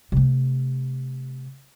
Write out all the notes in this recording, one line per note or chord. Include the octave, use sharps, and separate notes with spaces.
C3 A3